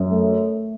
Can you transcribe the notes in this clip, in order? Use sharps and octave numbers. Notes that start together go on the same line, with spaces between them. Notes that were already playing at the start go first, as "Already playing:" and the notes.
Already playing: F#2
A3